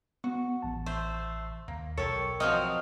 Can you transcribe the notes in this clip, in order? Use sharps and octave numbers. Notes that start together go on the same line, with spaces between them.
B3 F#4
A1 A5
A3 C5
D#2 A#3
B1 G4 A4 A#4 C#5 C#7
F3 F#3 C4 D#5 F6